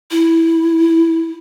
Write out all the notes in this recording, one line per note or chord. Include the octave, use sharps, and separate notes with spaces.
E4